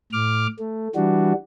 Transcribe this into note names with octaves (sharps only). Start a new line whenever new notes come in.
A2 D6 F6
A3
E3 G3 D4 F#4